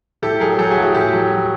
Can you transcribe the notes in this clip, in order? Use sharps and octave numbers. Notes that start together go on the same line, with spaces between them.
A2 G4 A4
F#3 G#4 A#4
F#3 G4 A4
F#4 G#4
A2
F#4 G#4
A2 G4 A4
F#3
F#3